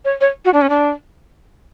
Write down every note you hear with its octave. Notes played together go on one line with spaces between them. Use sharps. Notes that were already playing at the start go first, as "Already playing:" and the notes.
C#5
C#5
F#4
D4
C#4
D4